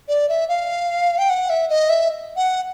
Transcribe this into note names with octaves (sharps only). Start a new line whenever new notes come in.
D5
E5
F5
G5
F#5
E5
D#5
E5
F#5